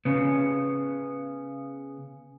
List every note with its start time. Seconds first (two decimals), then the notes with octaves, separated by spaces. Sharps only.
0.05 C#3 B3